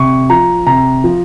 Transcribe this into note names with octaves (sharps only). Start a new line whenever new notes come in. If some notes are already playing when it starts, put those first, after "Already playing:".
Already playing: C3 C#6
F3 A#5
C3 A#5
F3